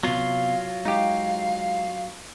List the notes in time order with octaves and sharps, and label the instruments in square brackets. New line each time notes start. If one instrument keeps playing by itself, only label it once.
[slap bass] C3 B3 [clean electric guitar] F#3 F4 [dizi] F5
[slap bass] G#3 [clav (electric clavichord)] D#4 G4 [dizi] F5